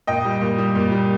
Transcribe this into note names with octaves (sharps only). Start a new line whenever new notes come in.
A#2 D#5 G5
G3
A#2
G3
A#2
G3